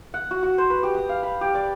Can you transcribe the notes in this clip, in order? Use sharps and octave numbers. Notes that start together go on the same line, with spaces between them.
F#5
F#4
F#4
C5
B4
G4
D#6
F5
B5
G4
D5